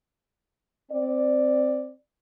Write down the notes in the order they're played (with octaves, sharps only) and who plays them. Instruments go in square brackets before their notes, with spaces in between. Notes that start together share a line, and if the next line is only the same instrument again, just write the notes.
[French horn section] C4 D5